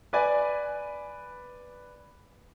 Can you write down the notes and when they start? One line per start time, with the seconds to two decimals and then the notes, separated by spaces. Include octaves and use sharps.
0.13 B4 D5 G#5